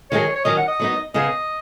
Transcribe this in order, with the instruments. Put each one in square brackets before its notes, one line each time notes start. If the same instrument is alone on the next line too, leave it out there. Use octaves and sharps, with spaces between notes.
[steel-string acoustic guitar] D#3 F#3 D#4 G#4 [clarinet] C#5
[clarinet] C#5
[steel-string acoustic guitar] D#3 F#3 C#4 [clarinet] D#5
[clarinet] F#5
D#5
[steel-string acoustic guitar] F#3 B3 D#4
[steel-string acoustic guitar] C#3 B3 G#4 [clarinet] D#5